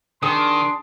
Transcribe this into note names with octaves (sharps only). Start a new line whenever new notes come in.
D#3 D4 G#4 C6 D#6